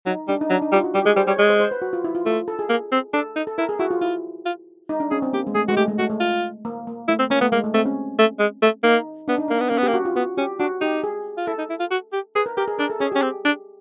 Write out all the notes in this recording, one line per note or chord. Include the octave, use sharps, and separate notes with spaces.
F#3 D#4
G3 D4
D#4
F#3 D4
D#4
G3 F4
F#4
G3 G4
G#3 G#4
G3 C5
G3 C#5
G#3 C#5
C5
C5
B4
F#4
F4
E4
F4
A3 F4
A4
G#4
A#3
C4
D4 A4
D#4
A4
E4 A#4
G#4
E4 F#4
F4
E4 F4
F4
D#4
D4
C#4 G#4
C4
A#3 G4
G#3
A3 G#4
G#3 F#4
A3 G4
G#3
A3 F#4
A3
F4
A#3
A#3
A3 E4
C4
A#3 C#4
A3 B3
G#3 A#3
A3
A3 C4
C#4
A3
G#3
A3
A#3 D#4
B3 D4
D#4
A#3 D4
B3
A#3 C#4
B3
G4
A#3
F#4
F4
B3 F#4
C#4 G4
D4 F#4
D#4 G4
G#4
F4
E4 A4
D#4
E4
F4
F#4
G4
G#4 B4
A#4
G4 A#4
G#4
D4 A#4
A4
C#4 G#4
C#4 G4
C4
D4